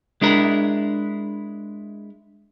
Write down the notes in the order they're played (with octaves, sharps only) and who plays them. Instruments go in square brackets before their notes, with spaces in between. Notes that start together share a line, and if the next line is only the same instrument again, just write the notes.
[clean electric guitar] G#3 D4 E4 A#4